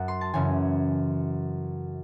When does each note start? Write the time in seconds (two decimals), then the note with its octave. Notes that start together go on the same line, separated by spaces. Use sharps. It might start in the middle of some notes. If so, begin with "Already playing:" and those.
Already playing: F#2 F#3 F#5
0.08 C6
0.21 A5
0.33 F#2 C#3 E3 G#5